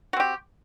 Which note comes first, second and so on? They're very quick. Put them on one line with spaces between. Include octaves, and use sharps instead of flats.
F#4 C4 G4